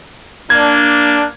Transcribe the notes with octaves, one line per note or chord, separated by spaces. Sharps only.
A#3 D4 G#6